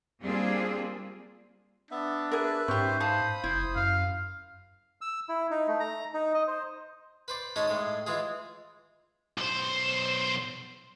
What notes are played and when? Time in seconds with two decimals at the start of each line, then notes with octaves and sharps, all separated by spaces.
0.23 G3 A#3 C4 D4 F4 G#4
1.91 B3 D4 E5
2.32 G#4 A#4 B4 E5
2.68 G#2 C#4 G4 C5
3.00 F5 A5 B5 D#6
3.44 F#1 E4 C5
3.76 F#2 F5
5.01 E6
5.29 E4
5.51 D#4
5.68 A3
5.80 A#5
6.14 D#4
6.34 D#5
6.47 C5
7.28 B4 C5 D5
7.56 G#3 C#4 D#4 A5 D#6
7.68 A2 G#3 D#6
8.07 E3 G#3 F4 G#4
9.38 B1 C5